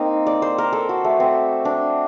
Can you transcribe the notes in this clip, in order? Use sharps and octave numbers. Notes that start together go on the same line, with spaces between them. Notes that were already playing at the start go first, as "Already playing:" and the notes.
Already playing: A#3 C4 D#4
D5
C5
A#4
A4
F#4
A3
C4
D4